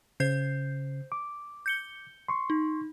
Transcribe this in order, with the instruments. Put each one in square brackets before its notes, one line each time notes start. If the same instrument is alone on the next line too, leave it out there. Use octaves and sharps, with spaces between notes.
[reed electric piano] C#3 [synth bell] C5 G6 C7
[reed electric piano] D6
[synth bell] G6 C#7 G7
[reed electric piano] C6 C#6
[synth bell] D#4